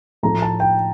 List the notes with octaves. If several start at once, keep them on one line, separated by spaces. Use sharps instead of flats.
A2 F3 A3 A#5
A5
G5